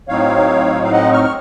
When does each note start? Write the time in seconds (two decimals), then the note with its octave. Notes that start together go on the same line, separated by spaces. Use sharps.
0.08 A2 F#3 C4 D#4 C#5 F5
0.83 F5
0.92 D#5 F#5
1.12 C#6 F6
1.24 C#6